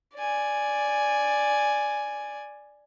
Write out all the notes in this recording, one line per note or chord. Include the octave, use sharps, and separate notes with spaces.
D5 G#5